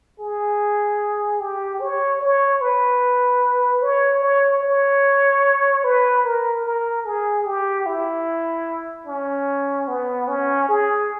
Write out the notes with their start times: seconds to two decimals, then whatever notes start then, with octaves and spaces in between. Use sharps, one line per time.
0.20 G#4
1.40 G4
1.81 C#5
2.21 C#5
2.61 B4
3.82 C#5
4.23 C#5
4.63 C#5
5.84 B4
6.25 A#4
6.65 A#4
7.05 G#4
7.46 G4
7.86 E4
9.07 C#4
9.88 B3
10.28 C#4
10.68 G#4